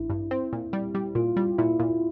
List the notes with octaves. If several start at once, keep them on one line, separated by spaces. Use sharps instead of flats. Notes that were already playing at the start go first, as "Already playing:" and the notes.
Already playing: A1 D4 E4
G2
C4
A#2
G3
G3
A#2 F4
G3
A#2 E4
A#2